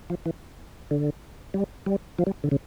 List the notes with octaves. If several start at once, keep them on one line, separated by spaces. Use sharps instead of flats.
F3
E3
D3
G3
G3
F3
G3
D3
C#3